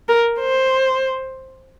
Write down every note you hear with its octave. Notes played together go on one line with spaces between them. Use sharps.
A#4
C5